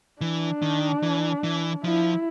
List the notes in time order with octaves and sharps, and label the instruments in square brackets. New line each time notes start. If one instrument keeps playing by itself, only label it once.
[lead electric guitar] E3 [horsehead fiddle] D4
[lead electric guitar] D#3
E3
E3
[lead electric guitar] F3 [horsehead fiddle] E4